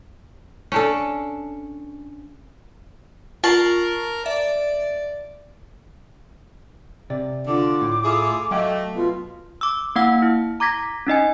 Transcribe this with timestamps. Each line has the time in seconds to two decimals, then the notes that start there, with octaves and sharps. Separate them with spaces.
0.72 C#4 D4 A4
3.44 F4 A#4 A5 C#6 F#7
4.26 D5 E5
7.10 C3 D5
7.47 D3 F4 D6
7.81 A2
8.04 E4 F4 G#4 A4
8.51 F#3 A3 D#5 F5 G5
8.95 B2 F4
9.61 D6 E6
9.96 A#3 E4 F5 F#5 E6
10.22 E4
10.60 A#5 D6 G#6 A#6 B6
11.07 C#4 D#4 D#5 G#5